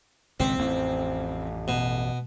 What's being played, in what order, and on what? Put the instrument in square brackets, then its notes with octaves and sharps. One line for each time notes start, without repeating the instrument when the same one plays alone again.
[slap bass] G#1 C#2 B2 [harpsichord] C4
[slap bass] A1 F2
[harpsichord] B2